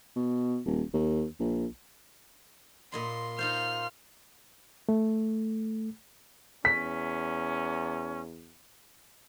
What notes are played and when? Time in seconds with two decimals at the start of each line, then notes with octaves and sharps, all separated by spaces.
0.16 B2
0.65 D#1
0.93 D#2
1.39 A#1
2.92 A#2 D#5 B5 C6
3.39 D#4 F4 C5 F6
4.89 A3
6.65 E2 C#4 B6